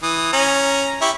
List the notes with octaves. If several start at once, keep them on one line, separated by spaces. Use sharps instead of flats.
E3 D#6
C#4 A#5
E4 G4 C#6